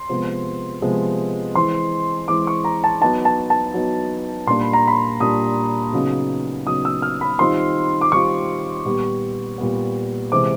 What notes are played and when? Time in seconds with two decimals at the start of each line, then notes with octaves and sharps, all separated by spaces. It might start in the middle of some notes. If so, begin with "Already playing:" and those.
Already playing: C6
0.09 C3 F3 G#3 B3
0.82 C3 F3 G#3 B3
1.55 E3 G#3 C4 E4 C6
2.28 E3 G#3 C4 E4 D6
2.47 C#6
2.65 A#5
2.84 A5
3.01 F#3 B3 D#4 A5
3.25 A5
3.50 A5
3.74 F#3 B3 D#4
4.47 A#2 G3 A#3 D4 C6
4.61 B5
4.73 A#5
4.88 B5
5.20 A#2 G3 A#3 D4 D#6
5.93 C#3 F#3 B3 D#4
6.66 C#3 F#3 B3 D#4 D#6
6.85 E6
7.02 F6
7.21 B5
7.39 D#3 G3 C4 F4 C6
8.01 D6
8.12 D#3 G3 C4 F4 C#6
8.85 A#2 G3 B3
9.58 A#2 G3 B3
10.32 C3 E3 G#3 C4 D6